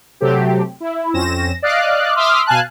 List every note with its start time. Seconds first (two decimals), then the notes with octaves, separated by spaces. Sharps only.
0.20 C3 F#3 A3 C4 G4
0.80 E4
1.13 F2 C4 C#4 A#6 E7
1.62 D5 D#5 F5 F#6
2.16 E5 C6 D6 D#6 F6 B6
2.46 B2 F5 G#5 A5 F#6